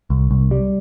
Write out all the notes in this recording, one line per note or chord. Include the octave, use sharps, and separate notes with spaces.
C2
C2
G3